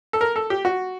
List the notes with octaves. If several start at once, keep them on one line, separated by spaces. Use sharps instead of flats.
A4
A#4
A4
G4
F#4